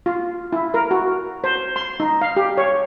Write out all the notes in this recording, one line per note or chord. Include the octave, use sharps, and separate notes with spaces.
F4
E4
A#4
F#4
C5
C6
D#4
F5
G4
C#5